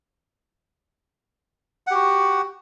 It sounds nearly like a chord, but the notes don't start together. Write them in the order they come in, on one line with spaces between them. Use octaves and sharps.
F#5 G4 F#4